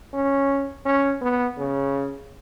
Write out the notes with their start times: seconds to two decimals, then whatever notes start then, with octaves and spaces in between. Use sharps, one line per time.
0.13 C#4
0.85 C#4
1.21 B3
1.58 C#3